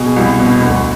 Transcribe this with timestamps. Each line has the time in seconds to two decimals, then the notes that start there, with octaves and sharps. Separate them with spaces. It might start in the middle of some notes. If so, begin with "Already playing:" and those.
Already playing: B2 G#4
0.16 C2
0.39 B2
0.61 D2